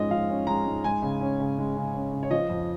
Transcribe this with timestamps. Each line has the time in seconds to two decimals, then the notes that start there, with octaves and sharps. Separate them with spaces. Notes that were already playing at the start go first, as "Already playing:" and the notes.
Already playing: G#2 F3 G#3 C#4 D#5
0.10 F3 F5
0.29 C#4
0.47 G#3 A#5
0.66 G#2
0.84 G#3 G#5
1.02 C#3
1.21 C#4
1.40 C#3
1.58 G#3
1.77 C#3
1.94 C#4
2.12 C#3
2.23 C#5
2.31 F3 D#5
2.49 F2